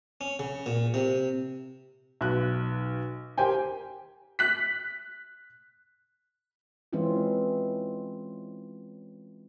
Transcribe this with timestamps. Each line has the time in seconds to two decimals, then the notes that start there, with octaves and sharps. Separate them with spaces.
0.21 C#4
0.39 C#3
0.66 A#2
0.94 C3
2.21 B1 F#6
3.37 G4 A#4 C5 G5 G#5
4.39 F#6 B6
6.93 E3 G#3 C4 C#4 E4 F4